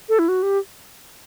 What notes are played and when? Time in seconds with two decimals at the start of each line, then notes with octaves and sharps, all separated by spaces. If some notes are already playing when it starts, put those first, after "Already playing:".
0.09 A4
0.19 E4
0.28 F#4
0.43 G4